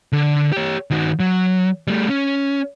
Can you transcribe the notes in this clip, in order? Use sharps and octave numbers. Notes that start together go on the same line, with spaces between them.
D3
G4 C#5
D#3 F#4
F#3
G3 A3
C#4